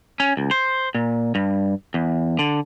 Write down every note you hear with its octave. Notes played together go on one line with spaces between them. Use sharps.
C#4
C#2
C5
A#2
G2
E2
D3